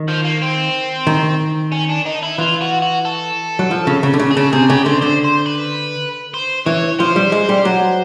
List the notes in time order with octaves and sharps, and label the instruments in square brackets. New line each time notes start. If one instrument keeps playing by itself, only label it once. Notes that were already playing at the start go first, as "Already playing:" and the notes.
Already playing: [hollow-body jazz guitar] D#3
[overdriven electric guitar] F3
A#3
C4
[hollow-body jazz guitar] D#3
[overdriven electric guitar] C#4
D4
D#4
E4
[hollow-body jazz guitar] E3 [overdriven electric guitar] F4
[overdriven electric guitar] F#4
F#4
A4
[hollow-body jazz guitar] F#3
F3
C#3
C#3
D3
C#3
[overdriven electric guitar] G#4
[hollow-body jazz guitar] C#3 [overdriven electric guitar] A4
[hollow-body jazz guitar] C3 [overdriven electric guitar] G#4
[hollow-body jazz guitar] C#3 [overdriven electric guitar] G4
[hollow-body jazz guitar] D3 [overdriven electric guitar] C5
[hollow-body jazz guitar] D3 [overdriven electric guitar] C5
[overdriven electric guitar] C5
B4
C5
[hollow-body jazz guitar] E3 [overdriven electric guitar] C#5
[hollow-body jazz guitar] F3 [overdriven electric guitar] C5
[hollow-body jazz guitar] G3
G#3
G3
F#3